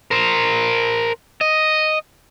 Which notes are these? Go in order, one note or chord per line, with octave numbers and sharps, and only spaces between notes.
A#4 C5
D#5